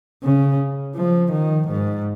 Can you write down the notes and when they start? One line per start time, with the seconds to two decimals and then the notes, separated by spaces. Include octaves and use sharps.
0.23 C#3
0.96 F3
1.32 D#3
1.69 G#2